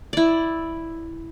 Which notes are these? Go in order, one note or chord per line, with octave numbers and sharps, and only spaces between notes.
E4 D5